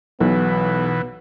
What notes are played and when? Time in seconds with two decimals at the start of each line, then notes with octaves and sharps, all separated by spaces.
0.21 B1 B2 E3 B3